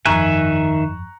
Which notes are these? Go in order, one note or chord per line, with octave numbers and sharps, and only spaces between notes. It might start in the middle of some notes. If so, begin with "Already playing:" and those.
G1 F2 D#3 E5 G#5 A#5 C#6 F#6